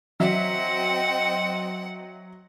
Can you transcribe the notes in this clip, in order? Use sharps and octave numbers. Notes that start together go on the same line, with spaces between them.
F#3 C4 D#5 E5 F#5